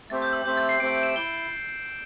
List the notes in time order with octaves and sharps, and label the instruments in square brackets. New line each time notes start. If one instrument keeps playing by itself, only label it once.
[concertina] A3 C4 G4 C5 E5 [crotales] A6
[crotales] G6
E6
[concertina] A3 C4 G4 C5 E5 [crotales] G6
[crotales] A6
C7
[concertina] A3 C4 G4 C5 E5 [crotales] D7
[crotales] D7
E7
[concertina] E4 [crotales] G7